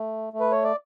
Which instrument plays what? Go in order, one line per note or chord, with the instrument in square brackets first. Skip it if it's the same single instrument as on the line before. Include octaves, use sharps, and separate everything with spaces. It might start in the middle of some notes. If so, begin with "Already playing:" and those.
Already playing: [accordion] A3
A3
B4
C#5
D5